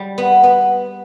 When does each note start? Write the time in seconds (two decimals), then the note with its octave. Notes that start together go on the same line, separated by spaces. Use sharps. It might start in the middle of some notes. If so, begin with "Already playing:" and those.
Already playing: G3
0.18 B3
0.44 B3